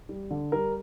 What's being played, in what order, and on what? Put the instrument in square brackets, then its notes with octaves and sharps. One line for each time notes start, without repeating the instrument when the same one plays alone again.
[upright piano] G3
D3
G3 A#4